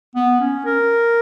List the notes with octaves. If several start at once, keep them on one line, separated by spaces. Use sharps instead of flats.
B3
C#4
A#4